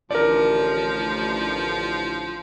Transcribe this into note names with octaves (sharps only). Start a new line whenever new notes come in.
A1 D3 F3 A#4 D5